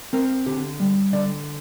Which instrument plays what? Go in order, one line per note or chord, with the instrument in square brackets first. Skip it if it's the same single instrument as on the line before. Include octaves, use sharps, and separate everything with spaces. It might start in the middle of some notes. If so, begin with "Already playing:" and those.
[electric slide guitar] C4 A#4
D3 G4
G3
D3 D5